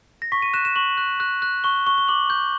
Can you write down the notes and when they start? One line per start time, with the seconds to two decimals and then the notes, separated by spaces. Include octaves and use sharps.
0.22 A#6
0.32 C#6 B6
0.42 D#7
0.54 F#6 E7
0.65 E7
0.76 C#6 F#7
0.97 F#6
1.20 F#6
1.42 F#6
1.64 C#6 G7
1.86 C#6 G7
1.98 G7
2.08 D6 F#7
2.30 G6